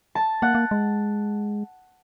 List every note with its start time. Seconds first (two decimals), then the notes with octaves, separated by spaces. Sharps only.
0.15 A5
0.42 A#3 F#5
0.55 A#3
0.71 G#3